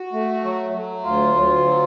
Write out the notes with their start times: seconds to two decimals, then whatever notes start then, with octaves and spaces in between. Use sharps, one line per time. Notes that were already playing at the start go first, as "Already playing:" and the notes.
Already playing: F#4
0.13 A3
0.43 F#3
0.73 F#3
1.04 D2 F4
1.35 D2
1.65 F#3